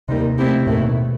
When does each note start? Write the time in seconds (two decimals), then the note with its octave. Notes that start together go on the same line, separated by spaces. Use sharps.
0.08 D#2 C3 D#3 G3 D#4
0.37 B2 A3 C4 E4 G4
0.66 D#2 A2 D#3 A3 E4
0.82 B2